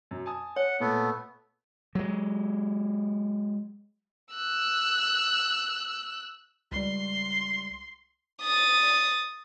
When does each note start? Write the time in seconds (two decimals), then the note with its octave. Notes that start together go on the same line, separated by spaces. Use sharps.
0.11 F#2
0.26 G#5 A5 D#6
0.56 C#5 F#5
0.80 A#2 A3 B3
1.95 F#3 G#3
4.34 E6 F#6
6.72 C#2 G3 C6
8.42 D#6 A6